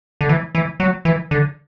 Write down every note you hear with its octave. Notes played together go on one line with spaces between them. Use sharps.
D3
E3
E3
F#3
E3
D3